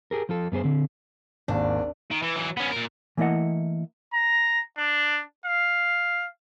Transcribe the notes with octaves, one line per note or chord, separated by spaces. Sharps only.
G4 G#4 A#4
F3 F4 A4
F#2 B3 G#4 C5
D3 C4
G#1 D#2 D4
D#3
E3
E3 F#3
B3 C#4
A#2 A#4
E3 A3 A#3 E4 D#5 F#5
A#5
D4
F5